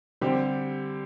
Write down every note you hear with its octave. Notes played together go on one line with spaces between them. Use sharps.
D3 G3 C4 G4